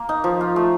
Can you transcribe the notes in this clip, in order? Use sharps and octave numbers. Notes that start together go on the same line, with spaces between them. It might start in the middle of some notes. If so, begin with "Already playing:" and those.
Already playing: A#3
D#4
F3
F4
A3